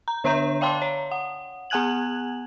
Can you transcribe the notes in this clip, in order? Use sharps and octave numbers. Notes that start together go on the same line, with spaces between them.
A#5
D3 D4 C#5 E5 A#5 G6
D5 F5 G5 A5 C6
C#5
F#5
B3 F#5 G#5 F#6 G#6 F#7